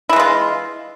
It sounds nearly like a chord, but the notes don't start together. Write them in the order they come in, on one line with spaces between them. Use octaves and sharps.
E4 E3 G#3 F4